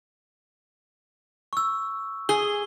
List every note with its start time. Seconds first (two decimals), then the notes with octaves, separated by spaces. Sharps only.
1.53 C#6 E6
2.29 G#4 G7